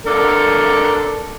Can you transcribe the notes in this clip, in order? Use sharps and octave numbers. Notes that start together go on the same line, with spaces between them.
D4 A4 A#4